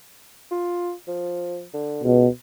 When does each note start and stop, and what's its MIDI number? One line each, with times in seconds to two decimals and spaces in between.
0.51 0.92 65
1.08 1.64 53
1.74 2.02 50
2.03 2.26 37
2.03 2.28 47